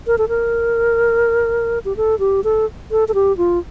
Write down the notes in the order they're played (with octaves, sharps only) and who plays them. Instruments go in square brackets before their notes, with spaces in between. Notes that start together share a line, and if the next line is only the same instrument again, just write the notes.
[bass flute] A#4
A4
A#4
G4
A4
G4
A4
A4
A4
G4
F4